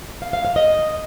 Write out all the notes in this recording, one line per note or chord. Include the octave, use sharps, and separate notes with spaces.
F5
F5
F5
D#5